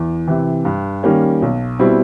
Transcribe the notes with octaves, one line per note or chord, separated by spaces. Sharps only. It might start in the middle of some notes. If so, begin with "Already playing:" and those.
Already playing: E2
C3 E3
G2
D#3 G3 A#3 C#4
B1
B2 G3 C4 E4